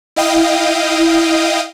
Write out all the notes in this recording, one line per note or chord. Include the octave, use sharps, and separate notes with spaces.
E4 D#5 F5 G5 D#6